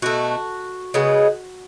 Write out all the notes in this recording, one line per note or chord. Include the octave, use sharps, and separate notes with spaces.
B2 A3 F#4
C#3 G#3 B3